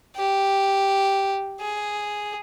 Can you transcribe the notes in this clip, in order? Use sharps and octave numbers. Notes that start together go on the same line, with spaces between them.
G4
G#4